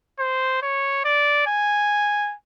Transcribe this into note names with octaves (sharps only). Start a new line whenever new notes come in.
C5
C#5
D5
G#5